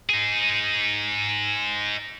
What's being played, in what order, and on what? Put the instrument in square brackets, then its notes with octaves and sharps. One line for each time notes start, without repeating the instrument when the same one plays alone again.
[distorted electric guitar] D#4 G#4